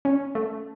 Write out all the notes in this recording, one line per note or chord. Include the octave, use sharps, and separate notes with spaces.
C#4
A3